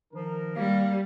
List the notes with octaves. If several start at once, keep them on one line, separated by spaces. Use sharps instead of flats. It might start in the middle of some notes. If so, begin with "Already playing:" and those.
D#3 F3 D#4 A#4
G3 A#3